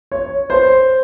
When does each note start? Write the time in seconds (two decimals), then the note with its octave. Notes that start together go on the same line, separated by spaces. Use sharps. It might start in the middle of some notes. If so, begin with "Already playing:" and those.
0.12 C#5
0.50 C5